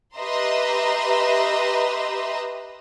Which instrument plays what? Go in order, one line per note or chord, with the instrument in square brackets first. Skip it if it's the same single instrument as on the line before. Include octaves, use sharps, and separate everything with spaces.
[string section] G4 B4 D#5 E5 A#5 C6